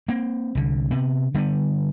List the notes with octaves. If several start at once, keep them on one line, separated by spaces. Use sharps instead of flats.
A#3 C4
C2 D3
C3 B3
D3 G3 A#3 B3